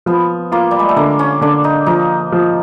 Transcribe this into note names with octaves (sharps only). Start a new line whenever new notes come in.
F3 B3
A#3 F4
G3
G#3
A3
D3 A#3
C#4
D3 D4
D#4
F3 D#4
F3